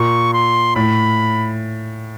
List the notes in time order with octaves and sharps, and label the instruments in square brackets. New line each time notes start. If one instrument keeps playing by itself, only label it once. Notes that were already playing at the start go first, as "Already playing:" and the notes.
Already playing: [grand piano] A#2 [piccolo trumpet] C#6
[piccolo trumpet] C6
[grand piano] A2 [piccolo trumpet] B5